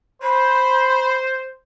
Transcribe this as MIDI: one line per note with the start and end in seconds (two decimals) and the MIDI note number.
0.22 1.56 72
0.22 1.14 83